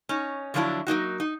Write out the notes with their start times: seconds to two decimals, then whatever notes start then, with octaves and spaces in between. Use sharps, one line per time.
0.09 C#4 D#4
0.54 D3 F3 F#3 A3 D4 E4
0.87 F#3 A#3 D#4 F#4
1.20 D#4